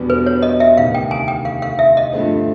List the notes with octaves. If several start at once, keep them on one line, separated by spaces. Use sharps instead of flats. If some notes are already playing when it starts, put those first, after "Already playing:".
Already playing: E2 B2 G3 B3 D4
B4
C#5
D#5
E5
D2 C3 D#3 F5
G5
G#5
G5
F5
F5
E5
D#5
G2 D3 F3 A3 C4